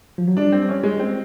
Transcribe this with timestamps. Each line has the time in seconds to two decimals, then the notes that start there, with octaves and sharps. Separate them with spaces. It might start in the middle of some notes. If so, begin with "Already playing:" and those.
0.18 F3
0.28 F#3
0.37 G3 D4
0.52 C4
0.69 C#4
0.84 G#3
1.00 C4